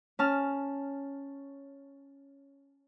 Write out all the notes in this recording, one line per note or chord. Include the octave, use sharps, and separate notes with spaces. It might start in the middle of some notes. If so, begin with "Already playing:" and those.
C#4 A5 F6